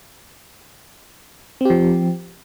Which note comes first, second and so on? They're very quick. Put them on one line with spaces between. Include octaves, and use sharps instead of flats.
C4 G4 F3